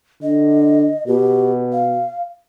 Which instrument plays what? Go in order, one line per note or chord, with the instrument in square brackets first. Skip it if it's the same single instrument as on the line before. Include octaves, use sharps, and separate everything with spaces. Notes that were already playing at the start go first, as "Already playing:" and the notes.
[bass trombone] D3 [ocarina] D#5
[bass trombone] B2 [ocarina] G4
[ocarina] F5